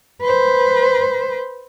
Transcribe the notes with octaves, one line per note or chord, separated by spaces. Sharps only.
B4 C5